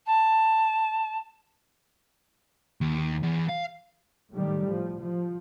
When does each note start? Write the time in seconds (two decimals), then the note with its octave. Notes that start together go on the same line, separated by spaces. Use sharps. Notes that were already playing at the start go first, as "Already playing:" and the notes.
0.06 A5
2.81 D#2
3.23 E2
3.49 F5
4.33 A2 D#3 G3
4.68 F3
4.99 F3